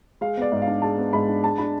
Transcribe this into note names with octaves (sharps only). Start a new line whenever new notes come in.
G#3 F5
B3 D5
G#2
F5
D4
G#3 A5
B3
G#2 B5
D4
G#3 A5
D4 B5